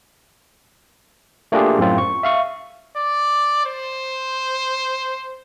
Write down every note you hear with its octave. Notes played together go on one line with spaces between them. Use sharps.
A3 A#3 D4 F4 G4 G#4
F#2 A2 C4 F4
C#6
E5 F5 C#6
D5
C5